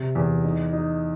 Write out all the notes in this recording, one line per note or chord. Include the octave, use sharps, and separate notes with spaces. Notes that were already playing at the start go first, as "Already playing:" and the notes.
Already playing: C3
E2
D#4
D#4